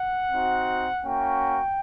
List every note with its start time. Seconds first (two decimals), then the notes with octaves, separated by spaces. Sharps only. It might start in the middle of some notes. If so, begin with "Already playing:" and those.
Already playing: F#5
0.31 C4 D#4 F#4
1.02 A#3 C#4 F#4 G5